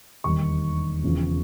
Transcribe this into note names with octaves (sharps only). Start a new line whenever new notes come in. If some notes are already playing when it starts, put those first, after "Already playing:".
E1 D#2 D#3 G3 C#6
E1 E2 C#3 F3